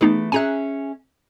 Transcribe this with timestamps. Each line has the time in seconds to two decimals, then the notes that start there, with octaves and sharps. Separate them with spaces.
0.01 E3 A3 B3 D#4 G#4
0.32 C#4 G#4 E5 G#5 A#5 F#6